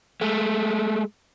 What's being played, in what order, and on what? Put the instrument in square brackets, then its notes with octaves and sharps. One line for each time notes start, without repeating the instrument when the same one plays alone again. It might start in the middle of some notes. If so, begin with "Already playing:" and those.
[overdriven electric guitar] G#3 A3